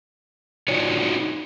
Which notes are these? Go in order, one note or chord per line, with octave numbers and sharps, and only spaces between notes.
D#4 F4 F#4 C#5 D5